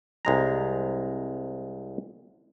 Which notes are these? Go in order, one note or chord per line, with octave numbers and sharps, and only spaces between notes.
C2 G#3 A#5